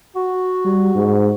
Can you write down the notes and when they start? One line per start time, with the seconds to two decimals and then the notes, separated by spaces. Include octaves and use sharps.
0.16 F#4
0.64 G3
0.95 G#2